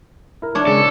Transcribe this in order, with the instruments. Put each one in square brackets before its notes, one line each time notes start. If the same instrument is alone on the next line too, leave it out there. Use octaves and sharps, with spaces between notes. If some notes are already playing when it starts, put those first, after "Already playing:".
[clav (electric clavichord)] E4 A#4
[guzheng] D4 C#5
[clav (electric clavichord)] C#3 G#3 [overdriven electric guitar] A4